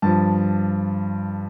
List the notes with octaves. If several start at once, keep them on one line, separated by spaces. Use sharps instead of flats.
G2 F3 A5